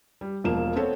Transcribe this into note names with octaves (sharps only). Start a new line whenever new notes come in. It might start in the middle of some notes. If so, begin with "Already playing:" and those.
G3
E1 F3 A#3 E7
B3 C4 A4 B4 C#5